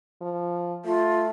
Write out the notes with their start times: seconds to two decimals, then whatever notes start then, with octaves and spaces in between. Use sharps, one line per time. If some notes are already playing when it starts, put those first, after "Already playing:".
0.21 F3
0.85 A3 F4